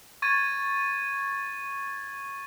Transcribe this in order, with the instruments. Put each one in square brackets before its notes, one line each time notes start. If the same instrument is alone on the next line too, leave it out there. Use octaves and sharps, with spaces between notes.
[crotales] C#6 G#6 A6 D#7